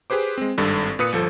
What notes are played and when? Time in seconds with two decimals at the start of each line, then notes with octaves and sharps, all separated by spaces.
0.10 G4 G#4 B4 C5 D6
0.38 G#3 C4
0.58 G#1 G2 A4
0.99 A#2 B4 D#6 C#7
1.12 G1 F3 A4